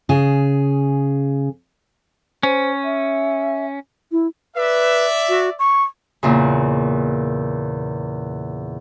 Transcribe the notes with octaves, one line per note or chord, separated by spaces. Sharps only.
C#3 G#4
C#4 C5
E5
E4
B4 D5 E5
F#4
C#6
E2 A#2 C#3